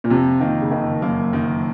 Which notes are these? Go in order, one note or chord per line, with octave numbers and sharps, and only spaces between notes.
A#2
F2 C3
D#3 A#3
C#3
F#1 D#3
F#2 A#3
F#2 D#3